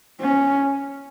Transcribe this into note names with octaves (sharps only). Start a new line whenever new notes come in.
C#4